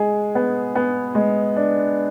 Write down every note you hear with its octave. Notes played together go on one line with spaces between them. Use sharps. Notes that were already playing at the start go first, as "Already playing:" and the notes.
Already playing: G#3 G#4
B3
B3
G#3
D4